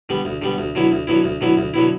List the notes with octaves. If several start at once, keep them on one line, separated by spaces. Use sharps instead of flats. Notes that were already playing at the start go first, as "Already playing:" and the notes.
D3 G3 B3
D2
D3 G3 B3
D2
D3 F#3 B3 E4
D2
D3 F#3 B3 E4
D2
D3 F#3 B3 E4
D2
D3 F#3 B3 E4